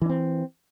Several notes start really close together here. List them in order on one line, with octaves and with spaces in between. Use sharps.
E3 D4 C4